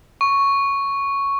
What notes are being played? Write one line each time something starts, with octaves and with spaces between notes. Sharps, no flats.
C#6